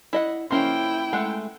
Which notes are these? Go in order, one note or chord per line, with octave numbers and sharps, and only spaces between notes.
E4 D#5 F#5
F3 A#3 C#4 E4 G5 C6
G#3 A3 F#5